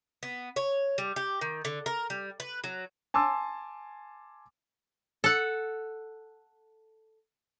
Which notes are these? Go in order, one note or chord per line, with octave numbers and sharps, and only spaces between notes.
B3
C#5
G3
G4
D#3
D3
A#4
G3
B4
F#3
G#5 A5 C6 D6 E6 A6
A4 F#5